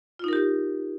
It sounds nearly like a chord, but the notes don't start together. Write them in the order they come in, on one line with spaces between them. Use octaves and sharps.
F4 D#4 A#4 G4